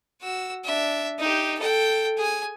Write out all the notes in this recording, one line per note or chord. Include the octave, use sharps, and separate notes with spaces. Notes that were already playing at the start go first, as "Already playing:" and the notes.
F#4 E6
D4 E5
D#4 G4
A4 G5
G#4 G#5